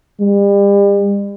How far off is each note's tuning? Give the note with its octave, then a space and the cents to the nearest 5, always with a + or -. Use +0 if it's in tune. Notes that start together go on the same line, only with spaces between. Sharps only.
G3 +40